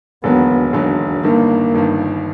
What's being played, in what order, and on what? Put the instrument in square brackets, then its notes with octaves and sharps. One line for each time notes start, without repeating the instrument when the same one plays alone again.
[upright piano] E1 D#2 D3 F#3 [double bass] B3
[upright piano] E1 D#2 D3 F#3
[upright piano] G1 G2 D#3 [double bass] A#3
[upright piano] G1 G2 D#3